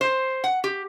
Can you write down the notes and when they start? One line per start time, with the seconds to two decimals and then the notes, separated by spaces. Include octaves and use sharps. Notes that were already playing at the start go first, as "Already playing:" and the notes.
0.01 C5
0.44 F#5
0.64 G4